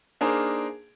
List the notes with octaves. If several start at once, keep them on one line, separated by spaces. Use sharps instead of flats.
A#3 D4 D#4 G#4 A#4 C5